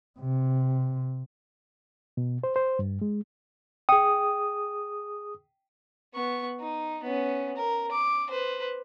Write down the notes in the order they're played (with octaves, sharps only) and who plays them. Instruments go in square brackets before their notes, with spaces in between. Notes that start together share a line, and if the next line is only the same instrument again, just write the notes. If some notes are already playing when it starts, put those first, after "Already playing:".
[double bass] C3
[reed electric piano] B2
C5
C5
G2
G#3
[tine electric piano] G#4 D#6 [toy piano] G5
[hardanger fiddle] B3 C#6
D#4
B3 C#4
A#4
D6
B4 C5